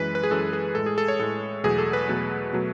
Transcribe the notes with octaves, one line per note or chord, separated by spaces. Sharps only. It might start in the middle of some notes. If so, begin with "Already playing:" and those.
Already playing: F#2 E3 G#3 B4
B4
G#4
F#2 E3 G#3 A4
G#4
A2 G#3 A4
G#4
A4
C#5
A2 G#3 A4
E2 B2 F#3 A3 G#4
A4
B4
E2 B2 F#3 A3
B2 F#3 A3